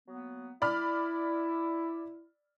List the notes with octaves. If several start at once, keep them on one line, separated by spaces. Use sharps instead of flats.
F#3 A#3 B3
E4 D5 B5 F6